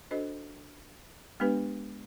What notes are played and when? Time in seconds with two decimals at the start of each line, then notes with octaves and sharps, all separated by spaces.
0.11 D4 F#4 A4 C5 D#5
1.40 G#3 B3 D4 G4 B4